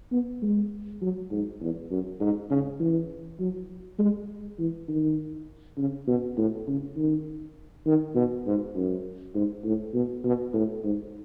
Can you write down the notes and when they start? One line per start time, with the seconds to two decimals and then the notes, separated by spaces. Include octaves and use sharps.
0.12 B3
0.42 G#3
1.02 F#3
1.31 G#2
1.61 E2
1.91 F#2
2.20 G#2
2.50 C#3
2.80 E3
3.40 F#3
3.99 G#3
4.59 E3
4.88 D#3
5.78 C#3
6.07 B2
6.37 A2
6.67 C#3
6.97 D#3
7.86 D#3
8.15 B2
8.46 G#2
8.76 F#2
9.35 G#2
9.64 A2
9.94 B2
10.24 B2
10.54 A2
10.84 G#2